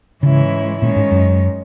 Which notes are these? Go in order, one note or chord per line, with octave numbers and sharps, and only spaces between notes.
G#2 C#3 E3 G#3 C#4 E4
A#2 D#3 G#3 C#4
G#2
F#2